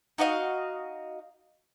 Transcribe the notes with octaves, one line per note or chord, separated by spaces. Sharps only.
D#4 F#4 D#5 F5